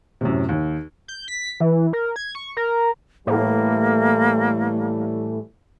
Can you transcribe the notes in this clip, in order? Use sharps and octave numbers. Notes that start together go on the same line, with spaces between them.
F#2 A2 C3
D#2
G6
B6
E3
A#4
G#6
C#6
A#4
A2 E3 G3 A3 A#3